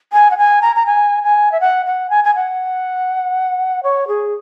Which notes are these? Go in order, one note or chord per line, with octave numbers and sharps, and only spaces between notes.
G#5
F#5
G#5
A#5
A#5
G#5
G#5
E5
F#5
F#5
G#5
G#5
F#5
C#5
G#4